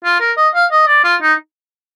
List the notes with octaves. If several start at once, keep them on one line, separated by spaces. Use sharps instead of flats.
F4
A#4
D#5
F5
D#5
D5
F4
D#4